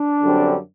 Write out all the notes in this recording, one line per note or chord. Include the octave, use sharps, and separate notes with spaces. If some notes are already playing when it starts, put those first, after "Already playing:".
Already playing: D4
F#2 D3 G3 C4